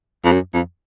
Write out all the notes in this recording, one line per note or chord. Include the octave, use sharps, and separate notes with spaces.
F2
F#2
F2